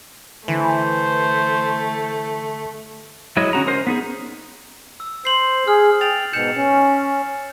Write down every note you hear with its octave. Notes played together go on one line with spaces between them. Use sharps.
D3 E3 A3 C5
F#3 G#3 E4 C#5 D#5
D3 C#4 F#4 A#5
C#4 A#4 C5
B3 D#4 G#4
E6
C5 C7 F#7
G#4 F6
G5 A6 F7
G#2 B2 G6 C#7 E7
C#4